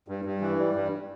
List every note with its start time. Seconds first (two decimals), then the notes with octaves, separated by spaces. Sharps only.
0.08 G2
0.25 G2
0.42 E3
0.59 G3
0.76 G2